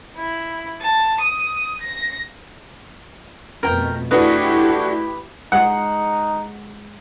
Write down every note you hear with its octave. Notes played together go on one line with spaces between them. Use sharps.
E4
A5
D#6
A#6
F2 B2 A3 A#4 G5
A3 D4 E4 F#4 G4 B4 D#5
G#3 D#4 F#5